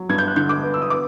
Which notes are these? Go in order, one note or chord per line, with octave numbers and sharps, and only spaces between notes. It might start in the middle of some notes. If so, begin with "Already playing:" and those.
Already playing: F#3
G2 G#6
G6
F#6
D3 G6
D6
B3
E6
D#6
B3 D6